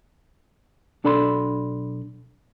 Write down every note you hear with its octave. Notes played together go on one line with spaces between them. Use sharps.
B1 D4 A4 D5 B5 C6